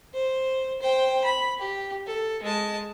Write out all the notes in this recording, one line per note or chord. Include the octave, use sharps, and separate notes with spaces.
C5
C5 G5
B5
G4
A4
G#3 A5